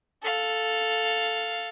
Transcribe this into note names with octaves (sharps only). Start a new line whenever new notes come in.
A4 F5